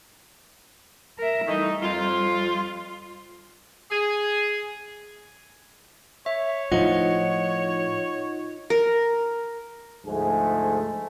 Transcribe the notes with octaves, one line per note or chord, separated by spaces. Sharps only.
A#4 E5
E3 G3 A3 D#4
F2 F4
G#4
C#5 E5
A2 F3 D#4 F4 D#5 F#5
A#4
D2 G#2 F3 A3 G#4